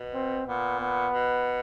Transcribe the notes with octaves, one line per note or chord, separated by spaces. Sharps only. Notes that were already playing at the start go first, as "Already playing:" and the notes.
Already playing: B2
C4
A#2 B3
B3
B2